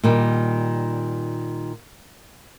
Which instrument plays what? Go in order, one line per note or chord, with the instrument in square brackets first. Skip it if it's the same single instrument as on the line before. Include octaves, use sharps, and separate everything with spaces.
[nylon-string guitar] A#2 D#3 G3